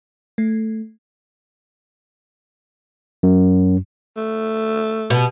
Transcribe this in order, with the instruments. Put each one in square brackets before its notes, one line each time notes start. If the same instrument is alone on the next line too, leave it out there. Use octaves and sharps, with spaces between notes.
[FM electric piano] A3
[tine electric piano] F#2
[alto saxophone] A3
[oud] B2